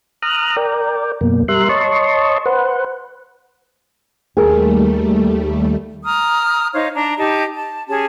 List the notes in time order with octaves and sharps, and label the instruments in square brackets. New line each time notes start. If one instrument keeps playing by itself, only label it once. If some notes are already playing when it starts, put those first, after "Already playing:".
[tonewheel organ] A#5 D#6 F6 F#6
A#4 D5 G5
F#2 B2 A#3
G3 A#4 E5 C6 F#6
C#5 D#5 A5 C6 C#6
B4 C5 F#5
[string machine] D#2 G3 A3 [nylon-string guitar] G#4 A#4
[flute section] A#5 D#6 F6
D#4 C5 C#5 F5
D4 A#5
D#4 G4 A5
A5
C#4 G4 G#4 A5